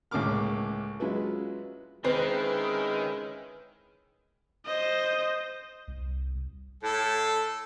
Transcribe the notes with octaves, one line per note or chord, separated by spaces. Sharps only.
C#2 A2 A#3 D6 F6
F#3 G#3 C#4 E4 F4 B4
D#3 G#3 C4 C#4 E4 B4
C5 D#5
C2
A2 A4